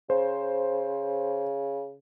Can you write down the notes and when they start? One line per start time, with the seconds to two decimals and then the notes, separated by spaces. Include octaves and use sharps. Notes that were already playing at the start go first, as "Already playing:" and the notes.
0.10 C#3 C5